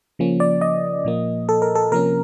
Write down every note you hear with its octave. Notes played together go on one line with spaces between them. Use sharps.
C#3 F3 A#3 C#4
D5
D#5
A#2 F3 A#3
A4
A#4
A4
C3 F3 A#3 C#4 A#4